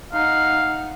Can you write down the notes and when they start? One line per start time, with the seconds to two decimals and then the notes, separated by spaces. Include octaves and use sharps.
0.13 D#4 F5 F#5